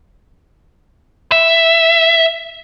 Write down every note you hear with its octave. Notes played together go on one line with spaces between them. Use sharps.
E5